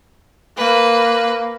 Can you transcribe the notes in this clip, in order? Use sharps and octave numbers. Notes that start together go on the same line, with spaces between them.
A#3 B4